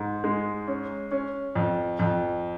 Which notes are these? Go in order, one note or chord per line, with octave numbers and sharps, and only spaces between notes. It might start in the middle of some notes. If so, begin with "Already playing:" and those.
Already playing: G#2
G#3
C#4
C#4
F2
F2